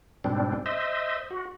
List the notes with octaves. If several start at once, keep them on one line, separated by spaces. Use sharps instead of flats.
G#2 B2 G3 C4 D4
C5 D#5 E5
F#4